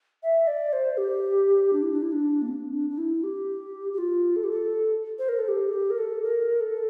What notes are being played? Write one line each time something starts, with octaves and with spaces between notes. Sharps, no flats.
E5
D5
C5
G4
D4
E4
D4
E4
D4
A#3
C4
D4
D4
E4
G4
G4
F4
A4
G4
A4
C5
A#4
A4
G4
A4
G4
A#4
A4
A#4
A4